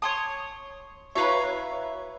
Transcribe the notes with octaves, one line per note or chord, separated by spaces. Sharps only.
C#5 A5 C6 D#6
E4 F#4 B4 C#5 E5 F5 A#5 C#6